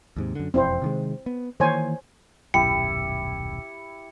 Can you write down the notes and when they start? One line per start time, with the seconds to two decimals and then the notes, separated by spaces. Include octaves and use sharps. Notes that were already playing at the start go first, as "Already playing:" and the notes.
0.16 D#2 G#2 C3
0.35 F#2 D3
0.54 E1 F2 C4 E4 C5
0.82 C3 D#3 G#3
1.26 B3
1.60 D#3 E3 A#3 C5 C#5 G#5
2.54 D#1 B1 F#2 E4 G4 G5 C#7